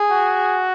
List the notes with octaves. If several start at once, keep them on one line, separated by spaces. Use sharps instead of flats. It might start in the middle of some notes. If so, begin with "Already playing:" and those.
Already playing: G#4
F#4